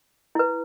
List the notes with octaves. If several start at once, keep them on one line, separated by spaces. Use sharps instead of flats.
E4 B4